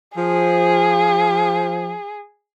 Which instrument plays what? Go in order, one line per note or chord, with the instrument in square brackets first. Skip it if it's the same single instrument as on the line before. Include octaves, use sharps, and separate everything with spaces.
[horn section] F3 [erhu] G#4